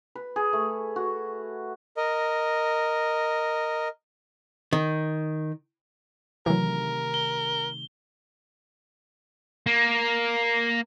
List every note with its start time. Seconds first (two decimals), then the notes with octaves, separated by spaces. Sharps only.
0.15 B4
0.36 G#4
0.53 A3
0.96 F#4
1.97 A#4 D#5
4.73 D#3
6.46 C3 D#3 E3 F#3 A3 A#4
7.14 G7
9.66 A#3